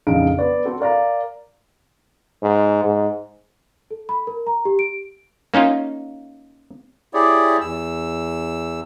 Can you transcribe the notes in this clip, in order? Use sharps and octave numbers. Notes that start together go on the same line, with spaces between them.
A#1 F2 C#3 D#4 F5 D7
B3 D5
C4 F#4 A4
A#4 D5 F5 A#5
G#2
G#2
A4
B5
A#4
A#5
G4
D7
A#3 C#4 D#4 F4
E4 G4 G#4 C#5 D5
E2 E6